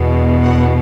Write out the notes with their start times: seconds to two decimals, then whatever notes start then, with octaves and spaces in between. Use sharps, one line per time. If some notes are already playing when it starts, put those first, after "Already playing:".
Already playing: E2 B2
0.43 F#5